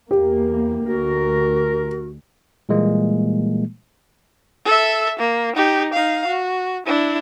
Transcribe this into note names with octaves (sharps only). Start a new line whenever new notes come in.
E2 A#3 G4
D2 F#4 A#4
A#2 E3 G3 G#3 A#3
A4 E5
A#3
D#4 G4
D#4 F5
F#4
D4 E4